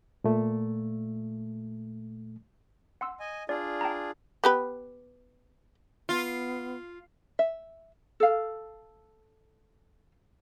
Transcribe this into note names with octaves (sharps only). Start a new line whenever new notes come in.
A#2 A3
F#5 C6 E6
D#5 G#5
D4 F4 G#4 D5
G5 A5 A#5
B3 G4 B4
B3 F4
E5
A4 F5